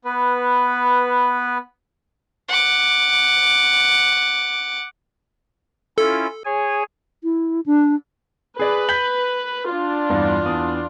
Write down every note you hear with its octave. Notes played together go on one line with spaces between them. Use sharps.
B3 B4
F#5 D6
C#4 E4 F4 A4
G#4 C#5 G#5
E4
D4
G#4 B4 D5
G6 B6 F#7
D4 F4
E2 G2
E2 D#6